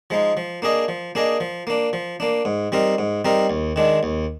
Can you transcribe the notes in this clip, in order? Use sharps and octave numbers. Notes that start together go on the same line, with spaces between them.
F3 G#3 D#4
F3
A#3 D4 G#4 D#5
F3
A#3 D4 G#4 D#5
F3
A#3 D4
F3
A#3 D4
G#2
G3 C4 D#4 A#4
G#2
G3 C4 D#4 A#4
D#2
D#3 G#3 D4
D#2